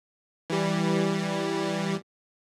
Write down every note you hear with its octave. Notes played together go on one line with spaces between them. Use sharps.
E3 G3